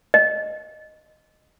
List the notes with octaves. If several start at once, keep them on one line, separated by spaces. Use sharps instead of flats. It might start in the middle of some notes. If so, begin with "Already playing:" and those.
D#5